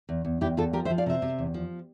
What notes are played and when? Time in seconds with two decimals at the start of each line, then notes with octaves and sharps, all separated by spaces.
0.09 E2
0.25 E2
0.41 E2 E4 G4
0.57 E2 F4 A4
0.73 F3 G4 A#4
0.85 C5 E5
0.90 F3
0.98 D5 F5
1.06 C3 C5 E5
1.22 C3
1.39 E2
1.54 F3